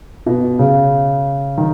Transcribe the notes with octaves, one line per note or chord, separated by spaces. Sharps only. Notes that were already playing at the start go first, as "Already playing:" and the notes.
B2
C#3
D#3